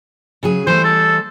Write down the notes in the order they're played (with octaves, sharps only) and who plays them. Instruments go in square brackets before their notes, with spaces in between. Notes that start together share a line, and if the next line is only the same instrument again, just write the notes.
[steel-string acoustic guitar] C#3 F#3 G#4
[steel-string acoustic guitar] E3 G3 A3 [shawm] C5
[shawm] A4